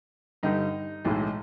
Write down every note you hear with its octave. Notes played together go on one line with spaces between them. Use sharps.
G2 D3 G3 D#4
B1 A2 E3 G#3